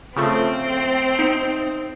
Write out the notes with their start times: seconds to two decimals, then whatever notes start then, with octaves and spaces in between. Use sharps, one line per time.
0.16 C#3 F3 A3 C4
1.19 D#4